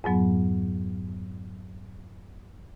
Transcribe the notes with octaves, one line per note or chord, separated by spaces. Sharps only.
F2 G#2 F#3 B3